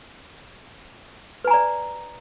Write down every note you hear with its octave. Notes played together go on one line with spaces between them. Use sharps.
B4 D5 G#5 A#5